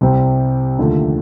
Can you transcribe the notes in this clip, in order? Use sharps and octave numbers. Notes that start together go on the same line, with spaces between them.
C2 C3 G3 C4
D#2 D3 F3 A3